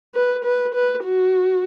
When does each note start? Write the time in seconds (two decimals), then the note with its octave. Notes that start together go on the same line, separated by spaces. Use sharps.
0.15 B4
0.45 B4
0.74 B4
1.04 F#4